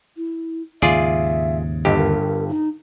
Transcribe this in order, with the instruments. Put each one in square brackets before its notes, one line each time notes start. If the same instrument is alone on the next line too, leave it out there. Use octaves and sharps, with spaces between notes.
[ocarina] E4
[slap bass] D#2 G#2 C#3 [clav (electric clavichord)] F4 G#4 D5 [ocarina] E5
[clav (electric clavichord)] G1 G2 G4 [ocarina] D#5
[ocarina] A#4
D#4